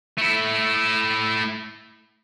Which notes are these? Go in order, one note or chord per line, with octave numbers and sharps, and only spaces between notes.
A3 E4